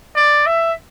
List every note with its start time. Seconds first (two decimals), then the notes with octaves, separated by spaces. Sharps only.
0.15 D5
0.46 E5